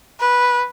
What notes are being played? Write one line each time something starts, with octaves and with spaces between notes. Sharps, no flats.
B4